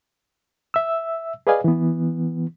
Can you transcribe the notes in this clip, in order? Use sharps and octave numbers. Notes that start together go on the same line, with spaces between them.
E5 E6
G#4 B4 D5 D#5 F5 G#5
E3 B3